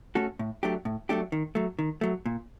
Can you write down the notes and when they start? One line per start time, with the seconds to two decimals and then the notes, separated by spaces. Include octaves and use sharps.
0.15 A3 C#4 F#4 A4
0.39 A2
0.63 F#3 A3 D4 G4
0.85 A2
1.09 F#3 A3 D4 G4
1.32 D#3
1.55 F#3 A3
1.79 D#3
2.01 F#3 A3
2.26 A#2